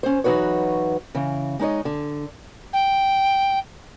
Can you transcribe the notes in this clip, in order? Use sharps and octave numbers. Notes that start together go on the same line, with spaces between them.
C#4 C5
E3 F#3 D#4 F#4 B4 C#5
C#3 E3
G#3 D#4 C#5 D#5
D3
G5